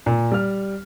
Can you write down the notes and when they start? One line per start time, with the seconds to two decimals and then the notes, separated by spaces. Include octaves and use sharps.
0.06 A#2
0.32 G3 F6